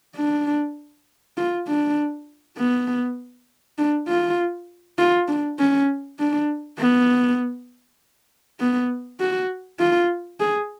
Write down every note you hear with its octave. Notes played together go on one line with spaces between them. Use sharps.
D4
F4
D4
B3
D4
F4
F4
D4
C#4
D4
B3
B3
F#4
F4
G#4